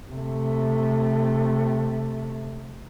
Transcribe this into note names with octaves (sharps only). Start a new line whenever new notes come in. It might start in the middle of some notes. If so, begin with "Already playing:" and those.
C3 A3